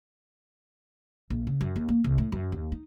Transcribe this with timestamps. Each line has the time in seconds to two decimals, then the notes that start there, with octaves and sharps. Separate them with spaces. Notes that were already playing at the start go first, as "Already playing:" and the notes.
1.30 A#1
1.47 C#3
1.61 F#2
1.76 D#2
1.89 A#3
2.04 C2
2.18 A2
2.32 F#2
2.52 D#2
2.72 D#4